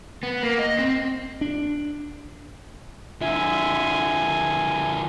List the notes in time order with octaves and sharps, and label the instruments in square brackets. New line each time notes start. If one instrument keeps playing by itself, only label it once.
[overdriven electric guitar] B3
A#3
D#5
C4
[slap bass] D4
[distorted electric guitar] D3 F3 [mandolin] E5 [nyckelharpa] G#5